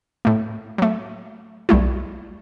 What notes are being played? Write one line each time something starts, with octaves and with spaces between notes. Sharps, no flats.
A2 A3
F#3 A3
B1 G3 A3 E4